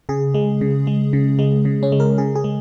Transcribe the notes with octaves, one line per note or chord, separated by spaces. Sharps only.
C#3 G#4
G#3
C#3
G#3
C#3
G#3
C#3
C#4
G#3
A#4
C#3 G#4
G#4
G#3